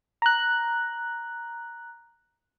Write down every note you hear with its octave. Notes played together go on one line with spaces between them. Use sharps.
A#5 F#6